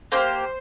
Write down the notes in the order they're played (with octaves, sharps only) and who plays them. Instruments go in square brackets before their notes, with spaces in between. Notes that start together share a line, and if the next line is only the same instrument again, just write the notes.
[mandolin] A#3 D#4 G4 C5